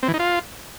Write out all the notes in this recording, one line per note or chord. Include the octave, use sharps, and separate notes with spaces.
C4
E3
D#4
F4